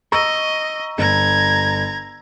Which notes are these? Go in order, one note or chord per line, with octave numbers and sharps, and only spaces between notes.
D#5 A#5 C#6 E6
G1 A#5 G#6